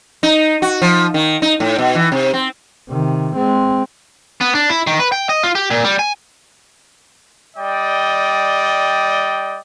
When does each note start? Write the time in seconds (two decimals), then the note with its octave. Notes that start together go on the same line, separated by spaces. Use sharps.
0.23 D#4
0.62 F#4
0.82 F3
1.14 D#3
1.42 D#4
1.60 A2
1.78 B2
1.95 E3
2.12 C3
2.34 C4
2.90 C3 D#3
3.36 G#3 C4
4.41 B3
4.55 D4
4.70 E4
4.87 D#3
4.99 B4
5.12 G5
5.29 D#5
5.43 F4
5.55 G4
5.70 A#2
5.84 G3
5.99 G#5
7.57 G3 D5 D#5 G5